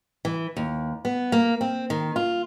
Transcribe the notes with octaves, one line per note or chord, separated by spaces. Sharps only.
E3
D#2
B3
A#3
C4
D#3
F4